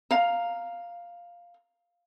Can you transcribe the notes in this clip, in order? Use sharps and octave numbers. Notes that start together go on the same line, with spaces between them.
F5 A#5